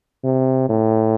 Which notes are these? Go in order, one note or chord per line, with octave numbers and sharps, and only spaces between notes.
C3
A2